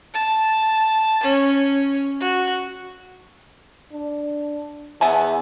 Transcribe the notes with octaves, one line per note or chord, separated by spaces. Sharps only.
A5
C#4
F#4
D4
E2 B3 E5 G#5 A5